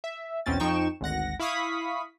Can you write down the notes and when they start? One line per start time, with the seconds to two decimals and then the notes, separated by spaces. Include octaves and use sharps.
0.04 E5
0.46 B1 E2 C4 C#4 A6
0.59 F2 F3 D#4 G5 C#6 E7
1.01 G#1 D2 F#5 A#6
1.39 E4 F5 B5 C#6 D#6 B6